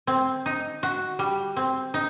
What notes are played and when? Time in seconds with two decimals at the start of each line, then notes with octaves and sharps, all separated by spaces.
0.07 C4
0.46 D#4
0.83 F#4
1.19 G3
1.56 C4
1.94 D#4